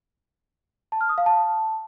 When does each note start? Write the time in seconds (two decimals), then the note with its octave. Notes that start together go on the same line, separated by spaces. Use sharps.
0.92 A5
1.01 F6
1.09 D#6
1.18 F5
1.26 A5